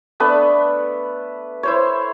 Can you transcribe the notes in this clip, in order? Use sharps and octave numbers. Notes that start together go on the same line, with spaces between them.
A3 B3 D4 B4
E4 C5 C#5